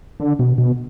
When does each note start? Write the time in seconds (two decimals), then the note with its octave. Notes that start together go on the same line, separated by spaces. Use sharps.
0.20 D3
0.39 B2
0.58 B2